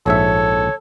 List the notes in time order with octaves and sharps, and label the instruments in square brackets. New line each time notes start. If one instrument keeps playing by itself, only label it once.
[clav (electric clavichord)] A#1 G#2 E5 [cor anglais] A4 [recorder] C#5